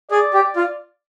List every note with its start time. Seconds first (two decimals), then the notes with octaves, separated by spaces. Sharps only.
0.10 G#4 D5
0.34 G4
0.41 D5
0.56 F4